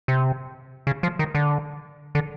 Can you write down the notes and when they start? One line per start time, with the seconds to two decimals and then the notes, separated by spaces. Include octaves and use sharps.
0.08 C3
0.87 C#3
1.03 F3
1.19 D#3
1.35 D3
2.15 D3